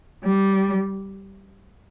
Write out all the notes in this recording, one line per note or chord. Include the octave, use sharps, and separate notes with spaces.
G3